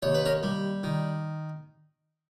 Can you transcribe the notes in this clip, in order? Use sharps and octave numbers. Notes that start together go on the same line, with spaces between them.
D#2 C#5
B4
A#4 C#5
G3
D#3